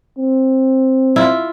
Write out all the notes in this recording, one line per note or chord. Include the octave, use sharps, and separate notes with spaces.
C4
E4 F4